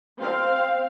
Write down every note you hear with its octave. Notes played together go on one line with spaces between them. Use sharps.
C4 F5